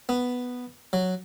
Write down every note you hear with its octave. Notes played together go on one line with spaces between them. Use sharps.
B3
F#3